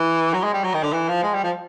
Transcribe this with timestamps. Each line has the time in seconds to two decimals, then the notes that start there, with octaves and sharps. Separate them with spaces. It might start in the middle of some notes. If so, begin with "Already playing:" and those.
Already playing: E3
0.34 F#3
0.44 G#3
0.54 G3
0.64 F#3
0.74 D#3
0.83 D3
0.93 E3
1.09 F3
1.23 G#3
1.34 G3
1.44 F3